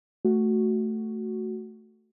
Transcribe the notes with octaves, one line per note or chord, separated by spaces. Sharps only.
A3 F#4